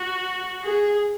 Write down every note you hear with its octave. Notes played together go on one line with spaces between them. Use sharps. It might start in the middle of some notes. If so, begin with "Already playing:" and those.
Already playing: F#4
G#4